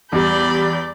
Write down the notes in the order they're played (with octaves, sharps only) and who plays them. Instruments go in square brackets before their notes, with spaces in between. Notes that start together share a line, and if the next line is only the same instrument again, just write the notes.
[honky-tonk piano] E2 G3 [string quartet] D5 B5 G6